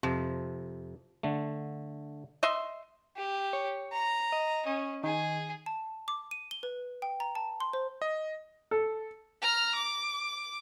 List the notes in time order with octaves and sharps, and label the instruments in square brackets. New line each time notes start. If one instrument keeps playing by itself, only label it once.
[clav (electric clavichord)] F2 C3 [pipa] F3
[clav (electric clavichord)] D3 A3
[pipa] D#5 E5 C6
[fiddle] G4
[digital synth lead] C#5
[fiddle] A#5
[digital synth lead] D#5
[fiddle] C#4 [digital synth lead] D#5
[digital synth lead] D#3 [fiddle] G#4
[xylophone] A5
D6
D#7
G7
B4
G5
A#5
A5
C6
C5
[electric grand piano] D#5
[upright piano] A4
[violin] A#5 F6
D6